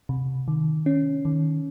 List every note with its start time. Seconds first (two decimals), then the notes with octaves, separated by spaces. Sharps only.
0.09 C3
0.48 D#3
0.86 C#4
1.25 D#3